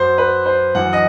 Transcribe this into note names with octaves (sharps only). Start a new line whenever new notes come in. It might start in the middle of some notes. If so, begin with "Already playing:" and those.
Already playing: F#2 F#3 C5
B4
C5
F#2 E3 F#5
D#5